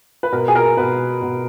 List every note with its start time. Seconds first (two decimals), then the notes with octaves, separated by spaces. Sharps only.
0.23 B4
0.32 B2 A#4
0.48 G#4
0.55 A#4
0.77 B2 B4
1.22 B2